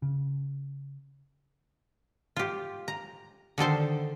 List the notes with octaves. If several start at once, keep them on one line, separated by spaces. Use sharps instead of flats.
C#3
F4 G4
A#5
D3 D#3 A4 C5